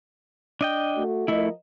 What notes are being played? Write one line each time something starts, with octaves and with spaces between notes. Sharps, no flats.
D4 D#5 G5
A3 F#4
F3 A3 E4 A#4 D#5